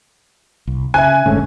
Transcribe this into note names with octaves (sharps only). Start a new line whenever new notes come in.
C2
C#3 E5 G#5 F#6
F#1 G#2 D3 A3 C#4